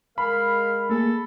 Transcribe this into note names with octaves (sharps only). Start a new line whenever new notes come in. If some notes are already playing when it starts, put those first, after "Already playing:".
G#3 A#4 F5 B5
A3 A#3 G#4 A4